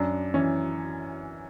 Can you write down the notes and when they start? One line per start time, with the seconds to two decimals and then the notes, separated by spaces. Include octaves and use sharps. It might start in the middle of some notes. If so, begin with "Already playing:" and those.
Already playing: F#2 D4
0.34 E3 C#4